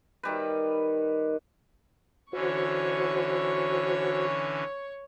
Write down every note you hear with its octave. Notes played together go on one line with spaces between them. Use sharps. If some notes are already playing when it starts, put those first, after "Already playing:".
D#3 G3 B4
D3 E3 C#4 F#4 C5 C#5 C#6